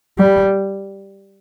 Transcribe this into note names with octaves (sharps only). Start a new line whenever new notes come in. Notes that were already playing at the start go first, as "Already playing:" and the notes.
G3